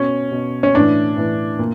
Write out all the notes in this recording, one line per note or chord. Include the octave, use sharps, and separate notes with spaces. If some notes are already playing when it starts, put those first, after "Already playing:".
Already playing: B2 C#4
B2
C#4
A2 E3 D4
A2 E3
A#2